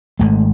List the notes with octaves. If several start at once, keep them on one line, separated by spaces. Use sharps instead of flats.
G#1 G#2 A3